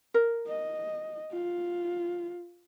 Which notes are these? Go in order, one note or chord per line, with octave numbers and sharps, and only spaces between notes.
A#4
D#5
F4